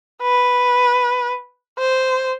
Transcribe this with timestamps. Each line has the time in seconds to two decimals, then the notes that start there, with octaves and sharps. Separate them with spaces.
0.22 B4
1.78 C5